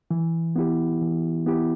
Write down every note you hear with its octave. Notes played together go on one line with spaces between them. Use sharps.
E3
B3 E4 G4
E3
B3 E4 G4